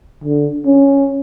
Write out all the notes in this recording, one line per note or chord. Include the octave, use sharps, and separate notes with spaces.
D3
C#4